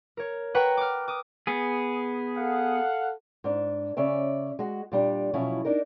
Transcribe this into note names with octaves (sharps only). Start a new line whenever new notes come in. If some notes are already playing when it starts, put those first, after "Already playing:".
A#4 C#5
B4 F#5 G5 A#5 C#6
D6 F6
D6 D#6
B3 G#4
A4 F5 F#5
G#2 D4
C#3 C#4 D5 E5
G#3 F#4
A#2 G3 D4
B2 F3 F#3 C#4 E4
D4 D#4 A#4